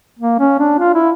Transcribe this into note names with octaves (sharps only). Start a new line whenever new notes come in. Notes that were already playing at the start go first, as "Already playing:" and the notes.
A#3
C#4
D4
F4
E4